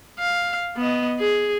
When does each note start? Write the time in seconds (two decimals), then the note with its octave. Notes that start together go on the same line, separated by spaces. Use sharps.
0.19 F5
0.77 B3 D#5
1.20 G#4